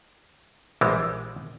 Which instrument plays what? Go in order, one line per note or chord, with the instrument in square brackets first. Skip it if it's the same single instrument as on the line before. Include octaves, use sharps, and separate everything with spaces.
[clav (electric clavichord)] A#1 E3 G3 G#3